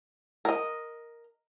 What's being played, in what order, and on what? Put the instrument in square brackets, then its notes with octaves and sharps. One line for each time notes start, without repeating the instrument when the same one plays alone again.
[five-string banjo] A#4 D#5